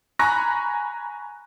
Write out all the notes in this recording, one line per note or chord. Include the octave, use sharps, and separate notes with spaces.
G#5 A#5 B5 C#6 F#6 A#6